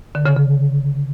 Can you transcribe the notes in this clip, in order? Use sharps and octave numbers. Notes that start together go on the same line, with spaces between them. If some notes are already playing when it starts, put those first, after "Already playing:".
D3
C#3
C#3